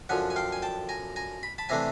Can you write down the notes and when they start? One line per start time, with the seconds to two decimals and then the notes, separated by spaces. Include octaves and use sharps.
0.09 F#2 D3 F3 F#5 G#5
0.30 G#5
0.36 F5 G5
0.52 G#5
0.62 G5 A5
0.89 G#5 A#5
1.16 G#5 A#5
1.43 B5
1.58 A5 B5
1.69 C3 E3 A3 D4 G#5 A#5